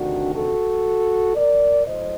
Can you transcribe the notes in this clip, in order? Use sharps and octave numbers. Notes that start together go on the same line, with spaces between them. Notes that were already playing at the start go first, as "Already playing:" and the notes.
Already playing: D2 C3 D#3 D4 F#4
F#4 A4
A#4 D5
A2 F#3 C5 D#5